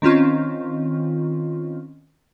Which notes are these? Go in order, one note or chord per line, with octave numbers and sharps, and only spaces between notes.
D#3 C4 C#4 F4